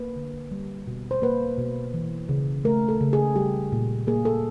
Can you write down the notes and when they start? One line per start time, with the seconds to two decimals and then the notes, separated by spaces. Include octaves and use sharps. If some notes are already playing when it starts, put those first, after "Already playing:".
Already playing: A#3 B4
0.16 D3
0.52 G3
0.87 B2
1.11 C5
1.22 A#3 B4
1.58 B2
1.94 E3
2.29 C#3
2.65 A3 A#4
2.89 A4
3.01 C#3
3.13 G#4
3.36 G3 G4
3.72 A#2
4.07 A#3 G#4
4.25 A4